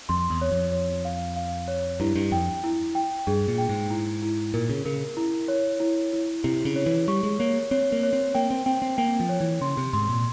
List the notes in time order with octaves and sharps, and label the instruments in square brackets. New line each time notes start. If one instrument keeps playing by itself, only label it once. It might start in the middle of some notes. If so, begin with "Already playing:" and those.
[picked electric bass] F2 [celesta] C6
[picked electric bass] E2
[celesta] C#5
[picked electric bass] F2
[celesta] C#5
F5
F5
C#5
[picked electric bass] G2 [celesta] E4
[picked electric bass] G2
[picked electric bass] F2 [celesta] G5
[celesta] E4
G5
[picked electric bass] G2 [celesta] G#4
[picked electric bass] A#2
[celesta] G5
[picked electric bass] G#2
[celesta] E4
E4
[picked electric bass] A#2 [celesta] A#4
[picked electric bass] C#3
[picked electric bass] C#3 [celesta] A#4
[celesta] E4
C#5
E4
E4
[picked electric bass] C3 [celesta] E4
[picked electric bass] C#3
[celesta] C#5
[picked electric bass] E3
[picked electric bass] G3 [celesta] C#6
[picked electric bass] G#3
[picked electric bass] A#3 [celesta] C#5
[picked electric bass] C4 [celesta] C#5
[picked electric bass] A#3
[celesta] C#5
[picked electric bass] C4
[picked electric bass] A#3 [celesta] G5
[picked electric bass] C4
[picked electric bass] C4 [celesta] G5
[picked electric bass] C4
[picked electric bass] A#3 [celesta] G5
[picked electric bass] F3
[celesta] C#5
[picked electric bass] E3
[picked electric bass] C#3 [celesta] C6
[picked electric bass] C3
[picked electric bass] G#2 [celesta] C6
[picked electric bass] A#2